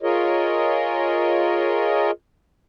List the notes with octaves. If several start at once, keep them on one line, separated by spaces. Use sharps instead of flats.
F4 G#4 A#4 C#5 D#5